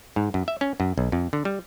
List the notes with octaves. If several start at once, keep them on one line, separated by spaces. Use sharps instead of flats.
G#2
F#2
E5
C#4
F#2
B1
F2
D3
G3